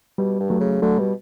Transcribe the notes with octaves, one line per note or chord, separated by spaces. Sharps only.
B2 G3
G2
F#3 A3
C#3
D3 F#3 A3
B2 G3